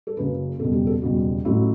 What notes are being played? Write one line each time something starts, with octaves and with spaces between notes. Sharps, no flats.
A4
F#1 F#2 C#3 F#3 B4
F#1 E2 B2 G3 A4
G4
A4
F#1 E2 B2 G3 F#4
A1 A2 F#3 E4